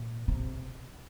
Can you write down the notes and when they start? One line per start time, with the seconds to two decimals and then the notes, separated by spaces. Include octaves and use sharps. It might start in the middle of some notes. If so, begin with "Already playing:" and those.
Already playing: A#2
0.28 C3